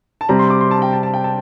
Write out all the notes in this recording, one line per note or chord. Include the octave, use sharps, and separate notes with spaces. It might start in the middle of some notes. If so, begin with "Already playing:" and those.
A5
C3 G3 C4 A#5
C6
D6
C6
A5
G5
A5
A5
G5
A5